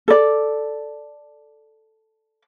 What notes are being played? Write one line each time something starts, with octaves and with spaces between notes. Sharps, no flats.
A4 D5